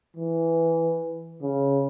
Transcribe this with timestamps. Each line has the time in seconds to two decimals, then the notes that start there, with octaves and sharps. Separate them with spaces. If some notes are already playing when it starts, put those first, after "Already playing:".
0.17 E3
1.42 C#3